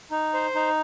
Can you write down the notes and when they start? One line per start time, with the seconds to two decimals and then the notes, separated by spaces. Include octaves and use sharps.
0.11 D#4
0.34 C5
0.55 D#4